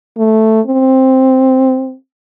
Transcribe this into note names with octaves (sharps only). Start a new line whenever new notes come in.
A3
C4